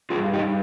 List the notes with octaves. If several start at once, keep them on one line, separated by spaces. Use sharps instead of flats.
G2 F3 F4 G#4
D#4 G4